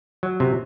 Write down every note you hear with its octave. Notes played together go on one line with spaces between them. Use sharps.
F#3
C3